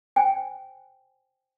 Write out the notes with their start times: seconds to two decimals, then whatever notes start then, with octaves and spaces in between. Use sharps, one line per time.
0.16 C5 G5 G#5